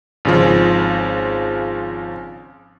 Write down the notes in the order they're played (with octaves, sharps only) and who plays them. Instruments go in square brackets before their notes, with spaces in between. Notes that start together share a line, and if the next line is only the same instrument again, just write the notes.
[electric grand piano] G#1 C#3 F3